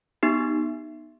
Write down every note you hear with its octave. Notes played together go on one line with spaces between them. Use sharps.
B3 D#4 G4